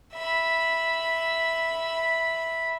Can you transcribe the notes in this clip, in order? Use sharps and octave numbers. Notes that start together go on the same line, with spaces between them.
E5 B5